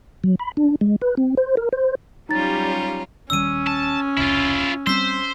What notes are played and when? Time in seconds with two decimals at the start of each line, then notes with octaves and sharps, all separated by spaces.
0.24 F#3
0.39 B5
0.57 D4
0.81 G#3
1.02 B4
1.17 C4
1.37 C5
1.57 A#4
1.73 C5
2.29 F#3 G3 C#4 D#4 F4 A#5 A6
3.30 D#1 D#3 G3 C#4 E6 D#7
3.67 A5
4.17 E1 C2 E4 F4
4.87 G3 C4 C5 E6 B6